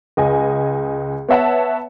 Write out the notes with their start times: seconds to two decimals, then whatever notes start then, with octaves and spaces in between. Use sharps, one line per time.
0.17 C#2 D#5 G#5
1.28 B3 C#5 E5 F#5 A5